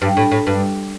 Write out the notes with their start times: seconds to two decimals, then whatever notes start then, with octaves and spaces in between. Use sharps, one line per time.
0.02 G2
0.17 A2
0.31 A2
0.47 G2